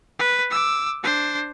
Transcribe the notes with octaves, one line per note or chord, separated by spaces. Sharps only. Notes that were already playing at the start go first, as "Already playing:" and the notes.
B4
D6 E6
D4 C5